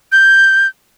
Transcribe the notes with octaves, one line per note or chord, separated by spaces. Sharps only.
G6